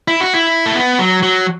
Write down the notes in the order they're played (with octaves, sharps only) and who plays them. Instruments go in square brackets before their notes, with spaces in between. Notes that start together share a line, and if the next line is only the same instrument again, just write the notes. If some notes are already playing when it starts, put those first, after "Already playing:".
[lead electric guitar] E4
F#4
E4
A3
B3
F#3
F#3